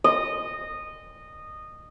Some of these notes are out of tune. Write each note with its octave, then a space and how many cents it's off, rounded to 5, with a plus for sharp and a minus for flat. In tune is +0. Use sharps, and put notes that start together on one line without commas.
D#5 -15